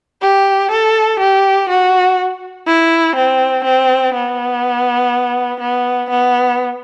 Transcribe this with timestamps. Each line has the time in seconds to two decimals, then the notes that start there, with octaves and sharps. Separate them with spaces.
0.21 G4
0.71 A4
1.20 G4
1.69 F#4
2.67 E4
3.16 C4
3.64 C4
4.14 B3
5.60 B3
6.10 B3